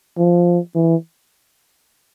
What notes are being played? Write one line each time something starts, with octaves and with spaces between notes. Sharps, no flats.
F3
E3